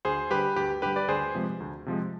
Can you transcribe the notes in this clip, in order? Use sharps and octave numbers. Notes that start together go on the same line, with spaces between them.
D2 G#4 C5
D3 G3 G4 B4
D2 G4
D3 G3 G4 B4
B4 D5
D2 G#4 C5
C3 F3 G#3
D2
C3 F3 G#3